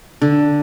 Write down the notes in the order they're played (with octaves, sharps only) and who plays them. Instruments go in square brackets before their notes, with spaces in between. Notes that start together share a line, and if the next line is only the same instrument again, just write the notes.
[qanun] D3